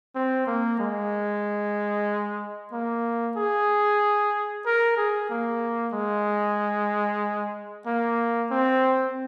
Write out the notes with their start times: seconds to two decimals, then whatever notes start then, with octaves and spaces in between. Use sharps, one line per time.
0.15 C4
0.47 A#3
0.79 G#3
2.72 A#3
3.37 G#4
4.66 A#4
4.97 G#4
5.30 A#3
5.93 G#3
7.87 A#3
8.51 C4